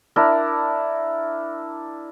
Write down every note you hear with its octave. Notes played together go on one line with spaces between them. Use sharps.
D4 E4 A#4